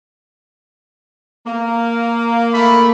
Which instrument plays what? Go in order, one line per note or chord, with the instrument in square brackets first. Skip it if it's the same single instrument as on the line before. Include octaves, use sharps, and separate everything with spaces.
[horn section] A#3
[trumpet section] A3 B5